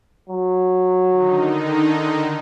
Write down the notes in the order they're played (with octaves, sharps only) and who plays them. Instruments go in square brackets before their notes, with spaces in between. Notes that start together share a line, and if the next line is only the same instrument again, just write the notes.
[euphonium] F#3
[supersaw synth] D3 D#3 D#4